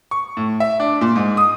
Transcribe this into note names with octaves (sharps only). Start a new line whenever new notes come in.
C#6
A2
E5
D4
A#2
G#2
D#6